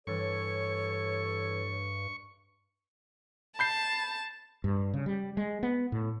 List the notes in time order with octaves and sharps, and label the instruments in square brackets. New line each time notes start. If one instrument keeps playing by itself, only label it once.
[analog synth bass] G2 [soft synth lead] E3 [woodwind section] A4 C#5 [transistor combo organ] C#6
[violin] A5 [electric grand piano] B5 G6 C7
[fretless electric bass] G2
C#3
G3
G#3
B3
A2